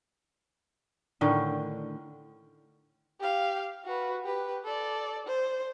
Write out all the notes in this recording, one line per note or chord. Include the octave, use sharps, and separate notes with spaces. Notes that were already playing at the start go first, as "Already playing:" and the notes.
A2 D3 D#3 C#4
G4 F5
F#4 B4
G4 B4
A4 D5
C5